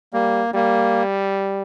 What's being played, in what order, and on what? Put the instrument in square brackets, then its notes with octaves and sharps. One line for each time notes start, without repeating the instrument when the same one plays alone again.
[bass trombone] G3 [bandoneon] A#3
[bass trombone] G3 [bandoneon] A#3